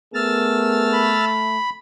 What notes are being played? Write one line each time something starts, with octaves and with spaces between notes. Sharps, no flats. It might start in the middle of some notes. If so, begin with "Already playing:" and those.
A3 B3 G#4 A#4 E6 F6 A6
B5